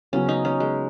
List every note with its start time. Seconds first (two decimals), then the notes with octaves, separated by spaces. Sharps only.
0.13 C#3 F#3 B3 C#4
0.28 D#4
0.45 C#4
0.60 G#3